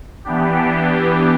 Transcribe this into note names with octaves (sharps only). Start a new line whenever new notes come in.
E3 B3 D4 G4